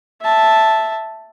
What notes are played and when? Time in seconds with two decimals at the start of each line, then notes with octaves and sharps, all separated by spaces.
0.22 E5 A5